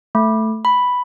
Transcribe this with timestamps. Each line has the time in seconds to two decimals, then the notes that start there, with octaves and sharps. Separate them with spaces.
0.15 A3
0.65 B5